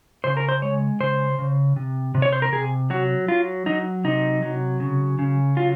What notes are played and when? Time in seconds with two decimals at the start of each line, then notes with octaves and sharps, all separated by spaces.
0.24 C#3 C5
0.37 A#4
0.49 C5
0.62 G#3 C#5
1.00 C#3 C5
1.39 C#3
1.76 C3
2.15 C3
2.22 C#5
2.33 C5
2.42 A#4
2.52 C3 G#4
2.90 F#3 F#4
3.28 F#3 F4
3.66 F#3 D#4
4.04 C3 D#4
4.42 F#3
4.80 C#3
5.19 C#3
5.57 F#3 F4